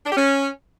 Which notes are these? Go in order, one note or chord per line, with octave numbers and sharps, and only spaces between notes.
D4
G4
C#4